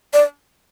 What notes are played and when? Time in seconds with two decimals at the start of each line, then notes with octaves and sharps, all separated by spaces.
0.13 D5